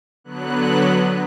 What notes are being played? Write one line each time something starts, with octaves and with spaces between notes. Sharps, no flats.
D3 F#3 B3 F#6